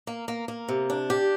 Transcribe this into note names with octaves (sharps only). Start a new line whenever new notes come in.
A#3
A#3
A#3
C3
D4
G4